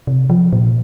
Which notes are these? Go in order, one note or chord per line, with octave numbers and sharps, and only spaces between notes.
C3
F3
A#2